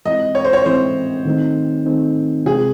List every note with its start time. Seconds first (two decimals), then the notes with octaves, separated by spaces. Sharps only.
0.05 E3 G#3 C4 E4 D#5
0.35 C#5
0.45 C5
0.53 C#5
0.65 E3 G#3 C4 E4 C5
1.25 D#3 A3 C4 D#4
1.86 D#3 A3 C4 D#4
2.46 C3 E3 G#3 C4 G#4